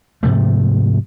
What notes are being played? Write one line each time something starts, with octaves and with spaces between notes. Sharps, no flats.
G#2 C3 F3 A3